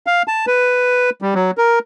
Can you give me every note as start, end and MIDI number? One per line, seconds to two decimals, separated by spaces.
0.07 0.23 77
0.28 0.46 81
0.47 1.10 71
1.22 1.34 55
1.34 1.51 54
1.58 1.79 70